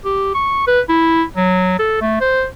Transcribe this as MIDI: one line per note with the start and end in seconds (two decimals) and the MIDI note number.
0.05 0.33 67
0.35 0.65 85
0.67 0.80 71
0.89 1.23 64
1.36 1.79 54
1.79 1.99 69
2.01 2.17 57
2.21 2.45 72